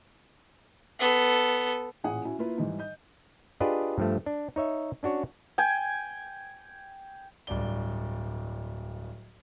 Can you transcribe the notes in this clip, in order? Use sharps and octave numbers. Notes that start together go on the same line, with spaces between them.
B3 A4
A1 A#2 G#4 F#5
C#4 E4 F#4 G#5
A#3 E4 F4 B4
G#2 D#3 E3 G3
D#5 G6
D4 F4 G4 G#4 B4 D#5
G2 F3 A3
D4
D#4 C#5 E5
C#4 D4 F#4 C#5
G5 G#5
D1 G2 D5 G7